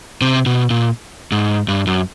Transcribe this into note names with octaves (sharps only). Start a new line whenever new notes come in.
C3
B2
A#2
G#2
G2
F#2